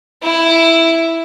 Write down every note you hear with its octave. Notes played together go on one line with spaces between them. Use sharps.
E4